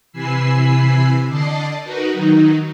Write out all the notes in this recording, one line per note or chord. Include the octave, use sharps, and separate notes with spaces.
C3 E3 G#5 B5 E6 C7
D3 D5 D#5 A5 C7
D#4 F#4 A#4 B4
D#3 F#3 D#4